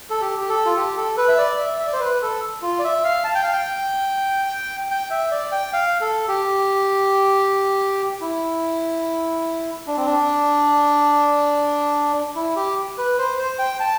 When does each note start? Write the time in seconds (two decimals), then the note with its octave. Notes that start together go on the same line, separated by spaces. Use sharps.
0.10 A4
0.21 G4
0.41 G4
0.49 A4
0.66 F4
0.76 G4
0.97 A4
1.17 B4
1.28 E5
1.38 D5
1.59 E5
1.80 E5
1.87 D5
1.93 C5
2.00 B4
2.22 A4
2.62 F4
2.79 D5
2.84 E5
3.04 F5
3.24 A5
3.35 G5
3.43 F5
3.53 G5
4.91 G5
5.10 E5
5.31 D5
5.52 G5
5.73 F5
6.01 A4
6.28 G4
8.21 E4
9.87 D4
9.97 C4
10.05 D4
12.36 E4
12.56 G4
12.98 B4
13.19 C5
13.39 C5
13.59 G5
13.80 A5